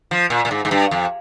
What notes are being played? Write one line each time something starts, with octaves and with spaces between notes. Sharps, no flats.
F3
A#2
A#2
G#2
G#2
G2
F2